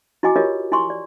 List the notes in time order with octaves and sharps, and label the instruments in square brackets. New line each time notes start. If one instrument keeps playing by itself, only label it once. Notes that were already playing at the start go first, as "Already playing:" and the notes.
[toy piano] E4 F#4 D#5 G#5 D6
F4 G4 A#4 B4 C#5 D#5
E4 G#5 C6 C#6
D5